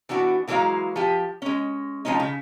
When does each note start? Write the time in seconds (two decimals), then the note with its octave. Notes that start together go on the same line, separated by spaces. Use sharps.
0.09 E3 B3 D4 F#4
0.47 C#3 E3 F#3 G#3 A#3 F5
0.96 F3 G4
1.42 G#3 C#4
2.05 F3 G#3 C4 C#4 D#4
2.20 C#3